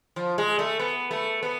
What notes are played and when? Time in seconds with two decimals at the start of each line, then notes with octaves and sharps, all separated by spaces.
0.16 F3
0.38 G#3
0.59 A3
0.79 B3
1.11 A3
1.43 B3